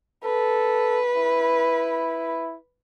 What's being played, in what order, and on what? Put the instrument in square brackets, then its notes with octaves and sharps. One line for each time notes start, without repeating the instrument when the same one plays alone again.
[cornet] A4 [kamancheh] B4
[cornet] E4